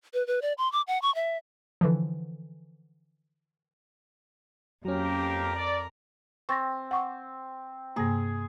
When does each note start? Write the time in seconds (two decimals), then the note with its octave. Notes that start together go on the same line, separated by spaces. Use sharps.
0.14 B4
0.27 B4
0.42 D5
0.58 C6
0.72 D6
0.88 F#5
1.02 C#6
1.15 E5
1.81 D3 E3 F3
4.85 F2 F#3 A#3 C#4 G4 A#4
5.55 D5
6.49 C4 C#6 A6 A#6
6.91 F#5 C#6 D6
7.96 G2 C3 A#3 G#4